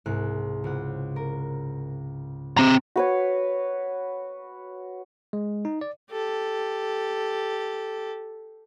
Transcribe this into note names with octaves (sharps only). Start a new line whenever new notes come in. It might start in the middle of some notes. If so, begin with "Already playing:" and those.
C2 G#2 F#6
C#2 F#5
A#4
C4 A#5
F#4 B4 C#5
G#3
D#4
D5
G4 A4